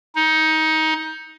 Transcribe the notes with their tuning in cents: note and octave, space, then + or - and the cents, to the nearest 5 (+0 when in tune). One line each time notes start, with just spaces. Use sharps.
D#4 +20